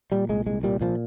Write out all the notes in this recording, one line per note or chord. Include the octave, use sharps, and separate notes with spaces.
A#2 G3
C2 G#3
C2 G#3
A#2 G3
A#2 F3